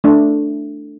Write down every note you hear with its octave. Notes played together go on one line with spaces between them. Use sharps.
A3 D4